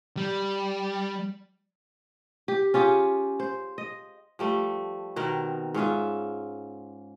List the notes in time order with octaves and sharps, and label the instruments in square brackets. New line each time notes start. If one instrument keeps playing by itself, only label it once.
[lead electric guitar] G3
[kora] G4
C#4 F4 G4 G#4
C5
D#5
F3 G3 A3
B2 D#3 C4 A#4
G#2 C#4 F4 E5